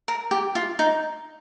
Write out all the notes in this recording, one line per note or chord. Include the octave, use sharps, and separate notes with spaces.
A#4
G4
F4
D#4